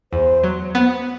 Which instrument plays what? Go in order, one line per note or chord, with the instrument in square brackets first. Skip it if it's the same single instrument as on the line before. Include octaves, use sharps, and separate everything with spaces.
[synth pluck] E2 [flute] C5
[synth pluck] F#3
B3